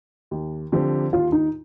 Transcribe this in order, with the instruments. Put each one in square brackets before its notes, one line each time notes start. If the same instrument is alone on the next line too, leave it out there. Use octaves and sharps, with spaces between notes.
[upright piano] D#2
D3 F3 C4 G4
[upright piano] D#2 [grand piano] F4
[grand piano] D#4